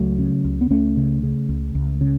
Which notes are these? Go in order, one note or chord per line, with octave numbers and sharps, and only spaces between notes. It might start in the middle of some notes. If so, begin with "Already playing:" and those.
Already playing: C#2 F#3 A3
C#3
C#2
B3
C#2 A3 C#4
C#3
C#3
C#2
C#2
C#3